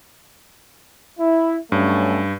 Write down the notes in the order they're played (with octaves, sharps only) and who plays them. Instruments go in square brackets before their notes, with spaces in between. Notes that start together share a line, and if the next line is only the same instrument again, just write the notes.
[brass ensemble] E4
[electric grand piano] G2 [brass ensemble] F#3 A3 C#4